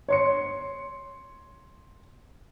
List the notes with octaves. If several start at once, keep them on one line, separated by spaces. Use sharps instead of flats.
C#5 C6 C#7